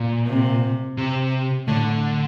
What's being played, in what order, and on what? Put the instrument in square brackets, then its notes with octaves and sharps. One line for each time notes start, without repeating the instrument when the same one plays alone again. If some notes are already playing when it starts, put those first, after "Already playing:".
Already playing: [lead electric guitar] A#2
[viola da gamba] C3
[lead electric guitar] C3
[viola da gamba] A2 A3 [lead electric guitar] D3